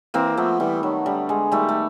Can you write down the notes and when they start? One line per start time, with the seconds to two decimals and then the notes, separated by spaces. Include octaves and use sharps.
0.14 E3 A#3 C4
0.37 F3 A3 B3
0.60 E3 G3
0.82 D#3 F#3
1.06 D3 G3
1.29 G#3
1.52 D#3 G3 A3
1.69 A3